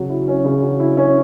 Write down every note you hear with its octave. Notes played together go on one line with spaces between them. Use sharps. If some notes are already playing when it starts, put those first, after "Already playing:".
Already playing: C#3 F#3
E4
C#4
C#3
F#3
E4
C#4